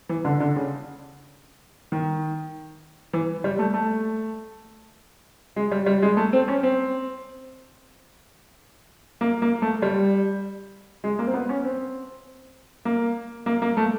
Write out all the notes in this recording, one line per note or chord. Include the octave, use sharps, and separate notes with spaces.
E3
D3
D3
C#3
D#3
E3
G3
A3
A3
G#3
G3
G3
G#3
A3
C4
C#4
C4
A#3
A#3
A3
G3
G#3
A#3
C4
B3
C#4
C4
A#3
A#3
A#3
A3